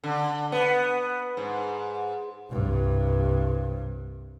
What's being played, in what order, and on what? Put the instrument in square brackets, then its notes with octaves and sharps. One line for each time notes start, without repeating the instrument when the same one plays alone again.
[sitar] D3
B3
G#2
[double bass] C2 G2